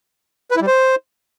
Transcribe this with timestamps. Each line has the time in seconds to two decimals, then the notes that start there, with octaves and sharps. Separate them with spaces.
0.51 B4
0.56 E4
0.62 G3
0.67 C5